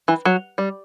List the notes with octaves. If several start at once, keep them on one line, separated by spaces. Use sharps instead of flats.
E3
F#3
G3